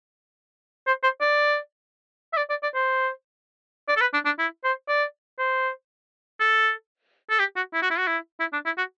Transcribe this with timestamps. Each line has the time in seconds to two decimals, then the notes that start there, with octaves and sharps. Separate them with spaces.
0.87 C5
1.03 C5
1.21 D5
2.33 E5
2.37 D5
2.50 D5
2.63 D5
2.75 C5
3.88 D5
3.96 A4
4.01 B4
4.13 D4
4.25 D4
4.39 E4
4.64 C5
4.88 D5
5.39 C5
6.40 A4
7.30 A4
7.39 G4
7.56 F#4
7.73 E4
7.82 F#4
7.90 E4
7.98 F#4
8.07 E4
8.40 E4
8.53 D4
8.65 E4
8.78 F#4